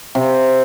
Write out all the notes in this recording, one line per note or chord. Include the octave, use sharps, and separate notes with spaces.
C3